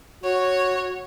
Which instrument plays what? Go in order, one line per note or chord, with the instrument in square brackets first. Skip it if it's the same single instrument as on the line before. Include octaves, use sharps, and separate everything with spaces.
[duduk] F#4 [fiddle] C#5